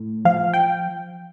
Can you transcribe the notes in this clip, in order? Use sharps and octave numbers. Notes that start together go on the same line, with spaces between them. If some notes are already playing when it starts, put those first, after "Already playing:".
Already playing: A2
F3 F5
G5